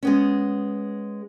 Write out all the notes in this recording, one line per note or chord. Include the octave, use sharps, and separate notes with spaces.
G#3 B3 C#4